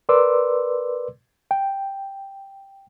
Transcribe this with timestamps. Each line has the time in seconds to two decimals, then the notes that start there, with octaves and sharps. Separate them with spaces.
0.09 A#4 B4 D5 C6 D6 E6
1.51 G5